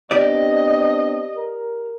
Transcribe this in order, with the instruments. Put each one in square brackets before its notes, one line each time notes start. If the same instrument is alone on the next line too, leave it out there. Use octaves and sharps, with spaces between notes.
[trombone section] B3 C4 D4 [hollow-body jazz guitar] G4 D5 [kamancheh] D#5
[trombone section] A#4